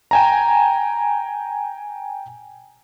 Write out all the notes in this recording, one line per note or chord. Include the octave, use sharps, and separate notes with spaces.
G5 G#5 A#5